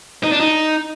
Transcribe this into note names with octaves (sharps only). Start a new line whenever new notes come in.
D#4
D4
D#4